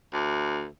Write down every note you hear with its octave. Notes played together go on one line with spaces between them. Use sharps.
D2